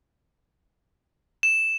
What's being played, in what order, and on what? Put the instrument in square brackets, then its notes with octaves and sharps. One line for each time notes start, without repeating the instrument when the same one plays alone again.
[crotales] E7